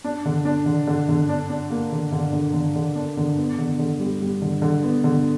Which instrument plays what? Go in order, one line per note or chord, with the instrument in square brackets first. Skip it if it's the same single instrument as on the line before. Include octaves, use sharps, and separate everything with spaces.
[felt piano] D4
D3
D4
D3
D3
D3
D4
D4
A#3
D3
D3
D3
D3
D3
D4
D3
B3
D3
D3
G3
G3
D3
D3
B3
D3